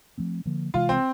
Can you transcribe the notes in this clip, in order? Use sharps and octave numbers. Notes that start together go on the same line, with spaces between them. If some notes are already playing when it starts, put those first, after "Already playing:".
F3 A3 C4
D3 F3 A#3
C3 E3 G#3 F4
C4